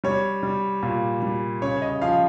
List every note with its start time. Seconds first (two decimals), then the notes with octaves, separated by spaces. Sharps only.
0.04 G3 C#5
0.43 G3
0.83 A#2
1.22 G3
1.62 C#3 C#5
1.82 D#5
2.02 F3 F5